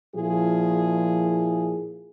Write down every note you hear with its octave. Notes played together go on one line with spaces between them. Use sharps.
A#2 F3 E4 G#4